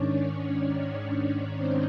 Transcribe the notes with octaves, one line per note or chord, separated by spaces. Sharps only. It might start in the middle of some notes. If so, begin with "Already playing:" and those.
Already playing: G#2 D#3 C#4 D4 C#5 D5
D4 D5
D4 D5
C#4 C#5
C4 C5